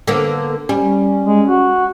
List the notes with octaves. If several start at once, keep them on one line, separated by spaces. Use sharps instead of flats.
D3 A#3 B3
G3 C#4
G#3
F#4